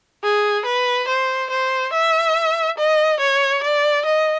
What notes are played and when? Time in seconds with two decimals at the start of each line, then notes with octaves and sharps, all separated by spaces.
0.23 G#4
0.66 B4
1.08 C5
1.50 C5
1.93 E5
2.78 D#5
3.20 C#5
3.63 D5
4.05 D#5